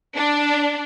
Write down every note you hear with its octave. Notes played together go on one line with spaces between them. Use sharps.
D4